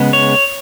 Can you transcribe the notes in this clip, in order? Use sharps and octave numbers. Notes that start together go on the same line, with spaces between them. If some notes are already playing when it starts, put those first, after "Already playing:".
Already playing: C#3 G#3 B3
C#5